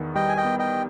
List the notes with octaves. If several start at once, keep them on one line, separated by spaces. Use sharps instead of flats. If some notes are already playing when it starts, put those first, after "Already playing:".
Already playing: E2 D#3 B3
G3 D#5 G5
G#5
D#5 G5
B3
D#5 G5